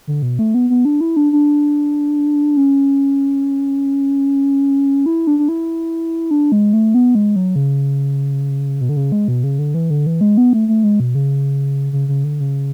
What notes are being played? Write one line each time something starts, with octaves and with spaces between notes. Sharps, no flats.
D3
B2
A3
B3
B3
D4
E4
D4
D4
C#4
E4
D4
D4
E4
D4
G#3
A3
B3
G#3
F#3
C#3
B2
D3
C#3
G#3
B2
C#3
D3
E3
D3
E3
G#3
B3
A3
A3
G#3
B2
C#3
C#3
C#3
D3
C#3